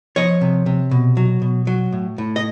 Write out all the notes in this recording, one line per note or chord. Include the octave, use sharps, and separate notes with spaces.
F3 C#5 D#5
C3
C3
B2
F#3
B2
F#3
A2
A2
D#5